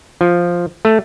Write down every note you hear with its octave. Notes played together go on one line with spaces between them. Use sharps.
F3
A3